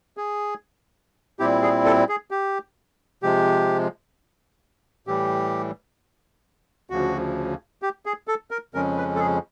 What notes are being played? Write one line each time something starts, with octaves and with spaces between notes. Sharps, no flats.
G#4
A#2 G3 C4 E4 G4
G#4
A4
G#4
G4
C3 F3 G#3 G4
A2 E3 G3 G4
D2 C#3 F3 F#4
G4
G#4
A4
A#4
F2 C#3 F3 G#3 C#4 A#4
B4
A4
G#4